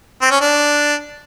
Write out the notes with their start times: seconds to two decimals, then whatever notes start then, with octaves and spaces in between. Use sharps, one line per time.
0.22 C4
0.31 C#4
0.41 D4